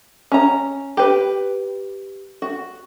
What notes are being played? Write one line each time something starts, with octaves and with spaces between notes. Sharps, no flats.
C#4 A#5
G4 B4
F#4